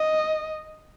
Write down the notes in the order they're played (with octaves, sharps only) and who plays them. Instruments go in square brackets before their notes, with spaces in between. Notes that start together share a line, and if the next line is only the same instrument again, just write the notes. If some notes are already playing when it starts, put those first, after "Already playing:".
Already playing: [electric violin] D#5